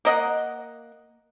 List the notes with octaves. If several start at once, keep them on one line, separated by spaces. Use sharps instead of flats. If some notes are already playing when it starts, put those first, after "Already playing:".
A#3 D#5 F#5